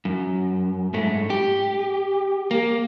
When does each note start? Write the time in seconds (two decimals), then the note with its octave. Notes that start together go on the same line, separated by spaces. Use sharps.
0.05 F#2
0.94 G#2 A3
1.30 G4
2.51 A#3